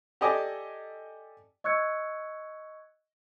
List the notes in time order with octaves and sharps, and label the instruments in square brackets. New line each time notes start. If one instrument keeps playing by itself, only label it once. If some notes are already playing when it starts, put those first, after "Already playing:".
[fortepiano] G4 A4 D5 D#5 G#5
[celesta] D#5 C#6 E6 F#6 G#6 C#7